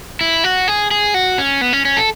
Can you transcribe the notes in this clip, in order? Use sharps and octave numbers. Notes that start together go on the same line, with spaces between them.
E4
F#4
G#4
G#4
F#4
C#4
B3
C#4
C#4
A4